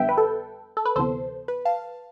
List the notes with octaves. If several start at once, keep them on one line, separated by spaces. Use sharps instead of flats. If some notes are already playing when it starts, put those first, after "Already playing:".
Already playing: F2 D3 G3 B3 E5 G5
B4
A4
A4
B4
D2 C3 E3 B3 A4 C5
B4
F5 A5